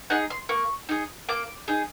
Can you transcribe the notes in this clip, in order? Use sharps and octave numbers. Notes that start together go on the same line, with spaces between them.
D#4 G#4 F#5
C6
A#3 C#6
D#4 G#4
A#3 D6
D#4 G#4